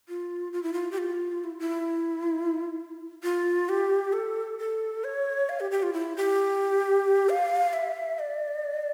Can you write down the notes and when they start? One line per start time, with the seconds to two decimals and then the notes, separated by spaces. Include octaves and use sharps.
0.09 F4
0.53 F4
0.63 E4
0.73 F4
0.91 G4
0.98 F4
1.44 E4
1.60 E4
3.23 F4
3.69 G4
4.13 A4
4.59 A4
5.04 C#5
5.49 F5
5.60 G4
5.71 G4
5.83 F4
5.93 E4
6.16 G4
7.29 F5
7.73 E5
8.19 D5